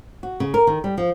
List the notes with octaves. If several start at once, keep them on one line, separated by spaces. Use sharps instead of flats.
F#4
C#3
A#4
D#3
G3
F3